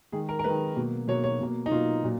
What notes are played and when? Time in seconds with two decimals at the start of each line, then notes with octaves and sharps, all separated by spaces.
0.12 D#3 G#3 G#4
0.29 A#4
0.39 A#4
0.44 D#3 G#3 B4
0.76 B2 F#3 A#3
1.08 B2 F#3 A#3 C#5
1.24 C#5
1.41 B2 A#3
1.66 D#4
1.71 B2 A#3 F4
2.04 A#2 F#3